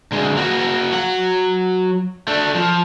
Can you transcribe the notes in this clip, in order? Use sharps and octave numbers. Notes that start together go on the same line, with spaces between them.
D2 G#3
A#3 F#4
F#3 F#5
A3 D4
F3